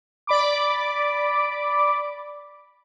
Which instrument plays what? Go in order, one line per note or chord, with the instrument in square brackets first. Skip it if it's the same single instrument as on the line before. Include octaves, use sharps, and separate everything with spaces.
[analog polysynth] D5 B5 D6